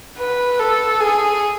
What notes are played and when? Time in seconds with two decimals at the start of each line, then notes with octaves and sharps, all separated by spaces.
0.18 B4
0.59 A4
1.00 G#4